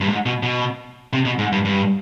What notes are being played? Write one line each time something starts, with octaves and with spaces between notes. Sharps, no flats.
G2
G#2
B2
B2
C3
B2
G#2
G2
G2